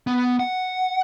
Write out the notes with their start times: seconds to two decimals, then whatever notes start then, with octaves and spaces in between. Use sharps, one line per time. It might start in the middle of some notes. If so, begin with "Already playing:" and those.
0.07 B3
0.40 F#5